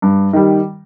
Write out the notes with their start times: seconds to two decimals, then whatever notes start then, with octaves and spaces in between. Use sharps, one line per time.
0.02 G2
0.33 D#3 G3